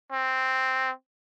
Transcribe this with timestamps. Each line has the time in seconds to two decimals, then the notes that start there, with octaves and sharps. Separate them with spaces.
0.12 C4